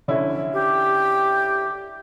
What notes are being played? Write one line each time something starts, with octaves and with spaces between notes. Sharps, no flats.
D3 C#4 E4
G4